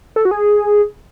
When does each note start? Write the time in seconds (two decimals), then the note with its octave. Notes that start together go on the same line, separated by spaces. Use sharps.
0.16 A4
0.25 F#4
0.31 G#4